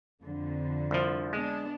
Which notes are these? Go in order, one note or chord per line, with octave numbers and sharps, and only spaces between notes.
F2 D3
C2 F3
G#3 B3 D4